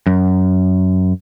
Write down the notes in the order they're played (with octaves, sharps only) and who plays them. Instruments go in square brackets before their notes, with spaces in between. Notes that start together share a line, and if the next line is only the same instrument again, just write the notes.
[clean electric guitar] F#2